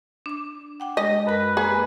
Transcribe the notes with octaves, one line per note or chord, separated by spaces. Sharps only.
D4 D6
F#5 G5 D6
G#3 D#5 A#6
F#2 A#4 B4
A#3 G#4 B4